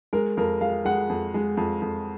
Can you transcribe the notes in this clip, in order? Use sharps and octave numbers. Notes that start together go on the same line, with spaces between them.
G#3 A#4
F2 A#4
G#3 F5
G#3 F#5
F2
G#3
F2
F2